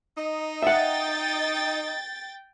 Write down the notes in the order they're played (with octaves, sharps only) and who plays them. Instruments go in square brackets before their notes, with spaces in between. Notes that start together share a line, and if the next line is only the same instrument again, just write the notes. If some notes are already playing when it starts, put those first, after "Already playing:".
[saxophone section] D#4 D#5
[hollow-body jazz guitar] E5 F#5 [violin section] G5 A6